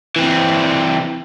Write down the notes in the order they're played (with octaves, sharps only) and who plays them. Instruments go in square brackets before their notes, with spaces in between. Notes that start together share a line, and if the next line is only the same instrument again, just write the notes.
[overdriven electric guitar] E3 C4